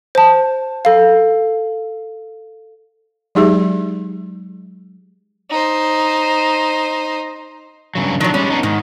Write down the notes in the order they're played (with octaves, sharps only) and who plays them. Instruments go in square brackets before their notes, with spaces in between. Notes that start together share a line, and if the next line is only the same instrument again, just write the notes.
[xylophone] C5 A5
A4 F5
[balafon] F#3 G#3 D#4 G4 G#4 E5
[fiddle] D#4 C5
[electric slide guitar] G2 C#3 F#3
[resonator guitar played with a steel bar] D#3 F#3 [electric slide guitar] F3 D4
[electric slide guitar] G3 G#3 [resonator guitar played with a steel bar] C#4
[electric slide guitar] B3 D4 D#4
[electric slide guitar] G#2 [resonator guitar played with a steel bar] D#3